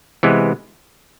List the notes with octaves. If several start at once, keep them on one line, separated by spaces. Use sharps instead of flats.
C3 E3 G#3 B3